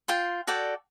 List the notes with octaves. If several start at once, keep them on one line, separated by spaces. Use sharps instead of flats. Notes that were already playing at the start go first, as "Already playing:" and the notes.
F4 G5 C6
F#4 A4 D5 G5